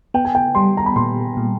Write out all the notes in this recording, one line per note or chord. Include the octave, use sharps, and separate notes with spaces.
B3 G5
G#5
G5
G3 C6
A#5
B5
A#2 C6
A#2